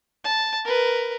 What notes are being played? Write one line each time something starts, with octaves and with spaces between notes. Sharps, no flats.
A5
A#4 B4